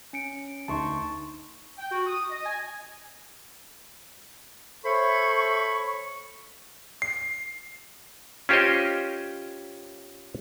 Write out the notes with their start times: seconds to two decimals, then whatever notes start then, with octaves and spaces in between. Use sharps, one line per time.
0.13 C#4 C#7 D7
0.68 D2 D#4 A5 C6 C#6
1.78 G5
1.92 F#4
2.07 D#6
2.30 D#5
2.46 G#5
4.85 A4 C5 C#5 E5 B5 C#6
7.02 C7
8.49 C#4 F4 G4 C5 C#5 D#5